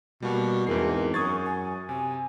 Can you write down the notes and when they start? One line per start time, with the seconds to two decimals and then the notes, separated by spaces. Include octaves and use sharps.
0.22 B2 G3 A#3 F#4
0.67 E2 G#2 C4 A#4 C7
1.14 F#2 C#6 D#6 G#6 A6
1.45 G#5
1.89 C3 G#5